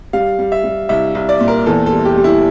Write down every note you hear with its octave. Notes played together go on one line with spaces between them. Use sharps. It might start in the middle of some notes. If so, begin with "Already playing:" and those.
G3 F5
G3
E5
G3
C2 E5
C2
D5
A#2
A#4
E2 A4
A4
G3
G4
G3
E4